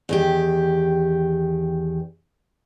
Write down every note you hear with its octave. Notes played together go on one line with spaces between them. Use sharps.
E2 D#3 G4